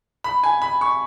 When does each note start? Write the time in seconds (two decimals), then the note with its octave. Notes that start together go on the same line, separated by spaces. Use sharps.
0.24 B5
0.43 G#5
0.62 B5
0.81 C#6